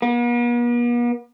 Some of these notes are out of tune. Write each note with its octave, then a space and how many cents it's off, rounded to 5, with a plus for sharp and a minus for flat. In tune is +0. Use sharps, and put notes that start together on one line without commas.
B3 -45